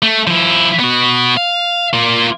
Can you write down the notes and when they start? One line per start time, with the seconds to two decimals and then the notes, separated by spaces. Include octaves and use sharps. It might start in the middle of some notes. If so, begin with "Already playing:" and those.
0.02 A3
0.27 F3 E4
0.80 B3 F#4
1.37 F5
1.93 A#3 F4